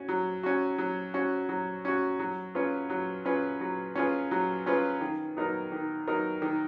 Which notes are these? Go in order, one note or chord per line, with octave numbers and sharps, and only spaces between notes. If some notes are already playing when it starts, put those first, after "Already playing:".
Already playing: C#4 F#4
F#3
C#4 F#4
F#3
C#4 F#4
F#3
C#4 F#4
F#3
C#4 F4 G#4 B4
F#3
C#4 F4 G#4 B4
F#3
C#4 F4 G#4 B4
F#3
C#4 F4 G#4 B4
D#3
F#3 B3 D#4 A#4
D#3
F#3 B3 D#4 A#4
D#3